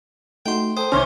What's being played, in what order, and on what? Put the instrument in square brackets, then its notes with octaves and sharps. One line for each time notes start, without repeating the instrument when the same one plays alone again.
[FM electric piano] A3 D#4 F#4 [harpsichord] G5 C6
[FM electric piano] A4 G5 D#6 [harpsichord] C5
[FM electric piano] C2 D#3 F6 [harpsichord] C3 [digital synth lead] C#4 [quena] C6